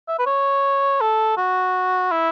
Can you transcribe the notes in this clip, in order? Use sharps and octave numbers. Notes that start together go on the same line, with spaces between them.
E5
B4
C#5
A4
F#4
E4